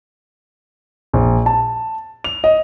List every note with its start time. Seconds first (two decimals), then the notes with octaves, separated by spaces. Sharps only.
1.13 A#1
1.46 A5
2.24 F7
2.44 D#5